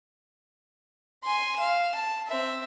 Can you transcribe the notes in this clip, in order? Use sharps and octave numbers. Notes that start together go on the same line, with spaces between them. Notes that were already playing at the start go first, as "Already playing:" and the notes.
G#5 C6
F5 E7
A5
C4 E5